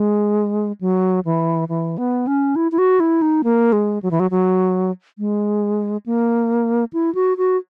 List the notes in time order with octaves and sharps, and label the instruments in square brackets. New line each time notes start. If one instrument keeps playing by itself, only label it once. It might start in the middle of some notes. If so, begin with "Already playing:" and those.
Already playing: [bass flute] G#3
F#3
E3
E3
B3
C#4
E4
E4
F#4
E4
D#4
A#3
G#3
F#3
E3
F#3
F#3
G#3
A#3
E4
F#4
F#4